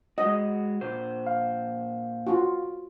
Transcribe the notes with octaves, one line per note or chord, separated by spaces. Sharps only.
G#3 F#4 D#5
A#2 C5
F5
F4 F#4